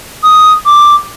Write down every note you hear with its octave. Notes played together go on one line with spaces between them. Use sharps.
D#6
D6